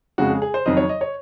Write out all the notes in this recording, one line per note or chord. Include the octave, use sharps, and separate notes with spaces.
F2 C#3 G#3 F#4
G#4
G#4
C5
F2 D#3 F#3 D#5
C#5
D#5
C#5